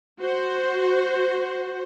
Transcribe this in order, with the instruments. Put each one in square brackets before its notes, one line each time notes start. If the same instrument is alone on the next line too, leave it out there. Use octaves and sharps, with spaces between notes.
[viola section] F#4 C5